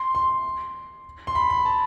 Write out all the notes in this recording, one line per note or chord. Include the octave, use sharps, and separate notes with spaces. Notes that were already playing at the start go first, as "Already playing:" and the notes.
Already playing: C6
C6
C6
B5
B5
A5